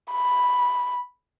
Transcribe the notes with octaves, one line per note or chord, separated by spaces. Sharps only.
B5